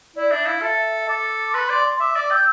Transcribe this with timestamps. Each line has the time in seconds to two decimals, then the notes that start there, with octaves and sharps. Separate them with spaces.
0.16 E4 D5
0.31 D4 E5
0.46 E4 F5
0.61 A4 E5
1.08 A4 D6
1.53 B4 C6
1.69 D5 C6
1.84 C6
2.00 E5 D6
2.15 D5 D6
2.31 G5 E6